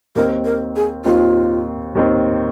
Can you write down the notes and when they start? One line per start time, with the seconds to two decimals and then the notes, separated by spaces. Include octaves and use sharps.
0.15 D#2 D#3 C4 A#4
0.45 A#4
0.76 G#4
1.05 D#2 D#3 C4 F4
1.95 D#2 D#3 C4